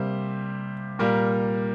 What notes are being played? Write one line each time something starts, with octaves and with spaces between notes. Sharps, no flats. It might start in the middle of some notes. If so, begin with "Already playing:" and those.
Already playing: C3 G3 A#3 C5
A#2 G3 A#3 A#4